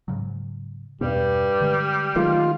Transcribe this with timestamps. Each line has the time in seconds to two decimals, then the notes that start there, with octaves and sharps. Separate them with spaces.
0.08 G#2 C#3 F#3
1.01 E2 G2 B2 G3
1.61 D3 G#3
2.16 D#3 F#3 G#3 A3 F4